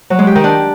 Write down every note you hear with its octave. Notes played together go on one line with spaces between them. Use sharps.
F#3
G#3
G4
D#3
D4